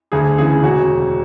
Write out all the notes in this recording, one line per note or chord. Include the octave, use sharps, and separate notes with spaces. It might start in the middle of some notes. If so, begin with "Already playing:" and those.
D2 G#4
C#3 E3 G#4
E1 F#4